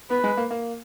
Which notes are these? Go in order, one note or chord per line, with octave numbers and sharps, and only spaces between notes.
B3 B4
G#3
A#3
A#3